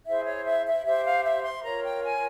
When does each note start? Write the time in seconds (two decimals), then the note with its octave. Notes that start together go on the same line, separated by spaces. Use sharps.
0.06 E4 G#4 C5 E5
0.25 C#5
0.46 E5
0.66 E5
0.85 G4 C5 E5
1.04 F5
1.24 E5
1.43 C6
1.64 F4 A#4 C#5 A#5
1.84 G5
2.03 G#5